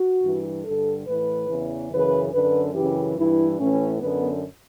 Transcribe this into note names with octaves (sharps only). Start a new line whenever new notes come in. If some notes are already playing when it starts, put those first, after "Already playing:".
Already playing: F#4
G2 E3
G2 D3 A4
A2 E3 B4
E2 C#3 E3
F#2 C#3 E3 B4
F#2 D3 B4
F#2 C#3 E3 G4
G2 E3 E4
A2 E3 C#4
F#2 D3 B3